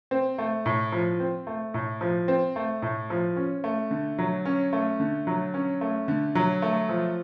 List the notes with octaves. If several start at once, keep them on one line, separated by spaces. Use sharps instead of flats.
C4
A3
A2
F3
C4
A3
A2
F3
C4
A3
A2
F3
C#4
A3
D3
F#3
C#4
A3
D3
F#3
C#4
A3
D3
F#3
A3
F3